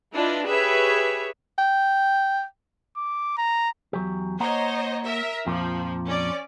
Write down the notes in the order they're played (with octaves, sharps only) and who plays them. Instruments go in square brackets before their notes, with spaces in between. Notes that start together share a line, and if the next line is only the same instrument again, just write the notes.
[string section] D4 E4 F4 B4 D#5
G4 G#4 B4 C#5 E5
[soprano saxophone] G5
[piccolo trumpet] D6
A#5
[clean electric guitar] E2 F#3 G4
[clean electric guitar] A#3 F#5 A#5 [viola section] C5 C#5 D#5
[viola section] A#4 E5
[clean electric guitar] F2 A#2 [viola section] F3
[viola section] C#4 D5